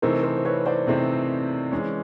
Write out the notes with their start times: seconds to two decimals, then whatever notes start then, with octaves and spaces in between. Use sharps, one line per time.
0.02 C3 E3 A3 C4 D#4 A#4 C5
0.23 A#4 C5
0.37 C5
0.45 B4 C#5
0.66 C5 D5
0.87 C3 E3 A3 C4 D#4
1.71 E3 G#3 C#4